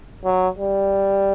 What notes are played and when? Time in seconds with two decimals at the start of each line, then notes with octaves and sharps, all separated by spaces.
0.24 F#3
0.58 G3